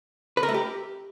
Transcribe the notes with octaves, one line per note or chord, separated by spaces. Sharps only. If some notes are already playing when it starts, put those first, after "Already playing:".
B4
A#4
A3
G4